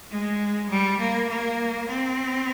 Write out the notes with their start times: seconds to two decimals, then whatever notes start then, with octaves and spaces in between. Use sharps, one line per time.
0.11 G#3
0.70 G3
0.99 A#3
1.29 A#3
1.88 C4